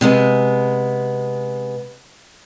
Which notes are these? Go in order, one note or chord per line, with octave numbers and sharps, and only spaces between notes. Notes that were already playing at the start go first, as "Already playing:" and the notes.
C3 G#3 B3